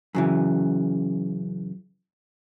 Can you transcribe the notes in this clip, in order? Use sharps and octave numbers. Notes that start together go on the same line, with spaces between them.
F#2 C#3 E3